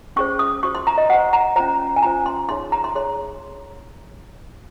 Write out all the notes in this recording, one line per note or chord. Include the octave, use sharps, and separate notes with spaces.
C#4 G#4 C5 C#6
D#6
F#4 C5 C#6
C6
A#5
D#5
F#4 C5 F#5
A#5
C#4 F4 C5 A#5
G#5
C#4 F4 C5 A#5
C6
D#4 G#4 C#5 C6
A#5
C6
D#4 G#4 C#5 C6